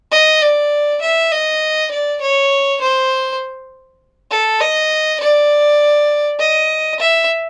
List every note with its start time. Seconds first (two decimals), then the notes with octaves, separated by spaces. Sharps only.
0.12 D#5
0.41 D5
1.01 E5
1.31 D#5
1.91 D5
2.21 C#5
2.81 C5
4.30 A4
4.60 D#5
5.20 D5
6.39 D#5
6.99 E5